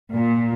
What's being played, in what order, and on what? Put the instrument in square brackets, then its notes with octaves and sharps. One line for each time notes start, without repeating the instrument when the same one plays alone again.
[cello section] A#2